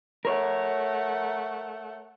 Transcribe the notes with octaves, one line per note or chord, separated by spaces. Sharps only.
A3 A#4 C#5 F#5